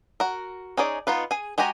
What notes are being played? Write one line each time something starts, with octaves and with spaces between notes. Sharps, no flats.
F#4 A#4
C#4 D#4 G#4 D5
B3 D#4 F4 B4
G#4 G#5
G#3 F#4 G4 G#5 A#5